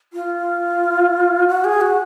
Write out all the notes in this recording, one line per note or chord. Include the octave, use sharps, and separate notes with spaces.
F4
F#4
G#4
F#4